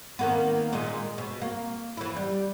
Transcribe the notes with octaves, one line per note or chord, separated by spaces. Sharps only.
D#3 A#3 B3
A#2 D#3 G#3
B2
A#3
E3 E4
G3